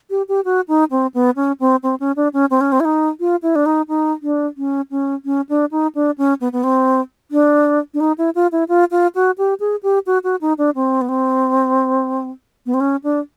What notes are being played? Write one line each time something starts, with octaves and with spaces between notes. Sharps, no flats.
G4
G4
F#4
D#4
C4
B3
C#4
C4
C4
C#4
D4
C#4
C4
C#4
C4
E4
D#4
F4
E4
D4
D#4
D#4
D4
C#4
C#4
C#4
D4
D#4
D4
C#4
B3
B3
C4
D4
D4
D#4
E4
F4
E4
F4
F4
F#4
G4
G#4
G4
F#4
F#4
D#4
D4
C4
B3
C4
B3
C4
C#4
D4